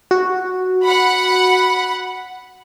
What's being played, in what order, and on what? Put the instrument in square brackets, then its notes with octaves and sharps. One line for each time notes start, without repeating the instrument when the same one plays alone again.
[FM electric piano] F#4
[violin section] F#5 B5